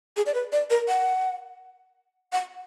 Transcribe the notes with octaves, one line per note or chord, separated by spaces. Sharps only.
G#4
D5
B4
D5
A#4
F#5
F#5